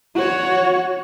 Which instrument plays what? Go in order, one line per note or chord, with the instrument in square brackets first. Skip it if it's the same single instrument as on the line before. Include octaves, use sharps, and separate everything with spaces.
[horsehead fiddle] F#4 C#5